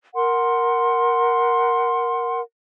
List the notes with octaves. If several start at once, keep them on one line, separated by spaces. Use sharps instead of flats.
A#4 F#5 C6